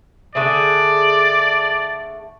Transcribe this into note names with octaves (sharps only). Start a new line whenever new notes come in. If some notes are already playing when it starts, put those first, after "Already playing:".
D3 A3 G#4 D5